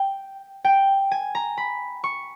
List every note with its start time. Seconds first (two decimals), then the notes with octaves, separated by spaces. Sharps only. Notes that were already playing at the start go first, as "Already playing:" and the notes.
Already playing: G5
0.64 G5
1.11 G#5
1.35 A#5
1.57 B5
2.04 C#6